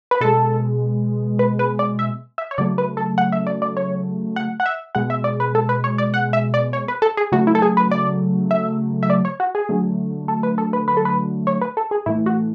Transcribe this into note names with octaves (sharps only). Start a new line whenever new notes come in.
B4
B2 G#3 A4
B4
B4
D5
E5
E5
C#5
C#3 F#3 A3 D5
B4
A4
F#5
E5
D5
D5
C#5
F#5
F#5
E5
B2 G#3 F#5
E5
D5
B4
A4
B4
C#5
D5
F#5
E5
D5
C#5
B4
A4
G#4
C#3 F#3 A3 F#4
E4
A4
G#4
B4
D5
E5
E5
D5
C#5
F#4
G#4
D3 F#3 A3
A4
B4
A4
B4
B4
A4
B4
C#5
B4
A4
G#4
A2 E3 A3 E4
F#4